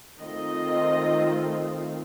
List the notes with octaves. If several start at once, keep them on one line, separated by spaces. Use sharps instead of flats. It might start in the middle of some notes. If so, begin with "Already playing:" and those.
D#3 A3 C4 F4 D#5